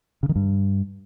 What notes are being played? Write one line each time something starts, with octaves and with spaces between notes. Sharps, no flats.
C#3
D#3
G2